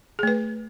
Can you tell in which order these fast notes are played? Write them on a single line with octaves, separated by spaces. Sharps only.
G#4 A3 B4